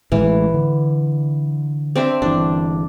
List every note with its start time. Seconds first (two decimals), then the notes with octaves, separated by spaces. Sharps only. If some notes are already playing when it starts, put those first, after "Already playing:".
0.12 A1 A2 E3 G#3
0.54 D3
1.96 C4 D4 E5
2.22 G1 E3 D4